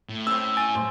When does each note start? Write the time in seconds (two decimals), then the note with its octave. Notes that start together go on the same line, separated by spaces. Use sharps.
0.09 A2
0.27 C4 C#4 E6
0.57 G#5 A6 D#7
0.74 A1 C5 C6